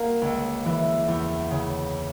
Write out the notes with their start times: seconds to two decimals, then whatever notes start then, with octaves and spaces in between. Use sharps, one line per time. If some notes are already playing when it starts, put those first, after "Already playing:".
Already playing: A#3 F#4
0.22 C#2
0.65 E3
1.08 E2
1.51 C#3